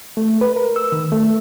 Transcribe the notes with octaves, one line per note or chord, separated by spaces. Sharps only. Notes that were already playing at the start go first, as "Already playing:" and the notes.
A3
B4
A#4
E6
D#3
A3